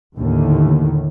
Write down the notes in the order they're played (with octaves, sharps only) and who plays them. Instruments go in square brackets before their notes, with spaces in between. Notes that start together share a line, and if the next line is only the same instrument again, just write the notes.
[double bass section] D#2 A2 D3 D#3